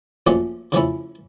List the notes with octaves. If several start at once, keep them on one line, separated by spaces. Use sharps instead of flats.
A#2 F3 A3 C#4 F#4
C#3 F3 A3 C#4 E4